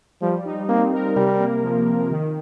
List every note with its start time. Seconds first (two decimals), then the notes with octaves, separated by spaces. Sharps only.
0.22 F3 G3
0.46 D#4
0.68 A#3 C4
0.93 A#4
1.16 C3 G3
1.40 A#3
1.63 F3
1.87 C3
2.11 D#3